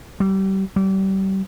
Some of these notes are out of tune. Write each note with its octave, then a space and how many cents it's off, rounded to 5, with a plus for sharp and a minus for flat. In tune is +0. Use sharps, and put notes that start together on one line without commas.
G3 -30
G3 -30